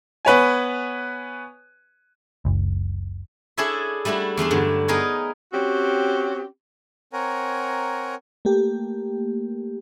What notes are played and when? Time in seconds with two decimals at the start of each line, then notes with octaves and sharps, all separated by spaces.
0.25 B3 B4 C#5 G#5
2.45 F#1 C#2
3.57 D4 E4 G#4 A4 C#5 E5
4.05 G3 A3 D4 E4 F#4
4.37 E2 A3 D4 C6
4.51 G2 D3 F#3
4.88 B3 D#4 G#4 A#4 C#5
5.53 C4 C#4 F#4 G4
7.13 C4 A#4 C#5 F#5 G#5 A#5
8.45 A3 A#3 G4